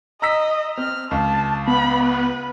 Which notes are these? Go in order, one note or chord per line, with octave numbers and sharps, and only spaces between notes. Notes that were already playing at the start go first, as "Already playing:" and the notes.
D#5 A#5 E6 B6
C4 F6
C#2 A5
B3 B5
B4